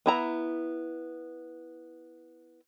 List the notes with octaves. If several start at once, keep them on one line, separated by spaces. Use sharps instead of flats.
B3 E4 A#5